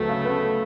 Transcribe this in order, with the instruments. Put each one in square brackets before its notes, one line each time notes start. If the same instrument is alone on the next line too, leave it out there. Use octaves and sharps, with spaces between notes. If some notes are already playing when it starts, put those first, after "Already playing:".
Already playing: [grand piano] D2 F#3 B3 [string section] A3
[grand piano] C#3
B3